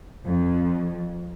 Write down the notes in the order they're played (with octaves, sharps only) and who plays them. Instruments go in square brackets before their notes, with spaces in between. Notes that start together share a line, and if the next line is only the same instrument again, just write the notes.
[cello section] F2